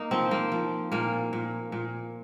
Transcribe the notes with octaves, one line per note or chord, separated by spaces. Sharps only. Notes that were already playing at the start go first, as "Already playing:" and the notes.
Already playing: A#3 D#4
F3 C4
A#3
F3
A#2 A#3
A#2
A#2